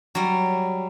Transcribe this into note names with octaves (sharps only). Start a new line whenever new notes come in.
F#3 G3